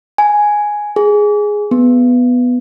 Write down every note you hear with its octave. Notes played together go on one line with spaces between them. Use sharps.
G#5
G#4
B3